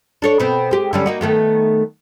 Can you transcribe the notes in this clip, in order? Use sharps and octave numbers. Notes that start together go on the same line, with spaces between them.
D4 A4 C#5
B2 B3 C4
G#3 G4
D3 G3 C#4
A#3 D#4 F#4
D#3 A3 B3